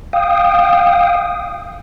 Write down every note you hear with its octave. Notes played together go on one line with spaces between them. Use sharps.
F5 G5 D#6